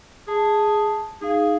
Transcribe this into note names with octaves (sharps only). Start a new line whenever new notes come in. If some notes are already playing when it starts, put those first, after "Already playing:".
G#4 A5
D#4 G#4 F5